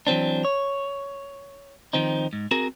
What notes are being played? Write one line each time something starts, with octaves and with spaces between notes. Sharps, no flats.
E3 F#3 C4 D4
C#5
D#3 F3 C4 D#4
G#2
C4 F#4 G#4 A#4